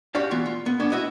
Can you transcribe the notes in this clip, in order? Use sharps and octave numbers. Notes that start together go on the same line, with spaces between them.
F#4 G4 D5 F5
E3 B3 F4
F4
B3
B3 C#4 D4
E4 F#4 B4 D#5